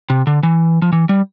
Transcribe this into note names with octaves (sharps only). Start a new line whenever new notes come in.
C3
D3
E3
F3
E3
G3